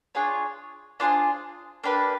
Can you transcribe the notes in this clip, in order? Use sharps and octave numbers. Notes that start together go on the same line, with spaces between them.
D4 F4 G#4 C#5
D4 F4 G#4 C5
A#3 D4 G4 B4